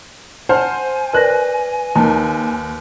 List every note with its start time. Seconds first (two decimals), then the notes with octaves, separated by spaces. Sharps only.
0.49 C5 F#5 G#5 A5 F6
1.13 A#4 B4 D5 F#6 A#6
1.95 D#2 A#3 D#4 A5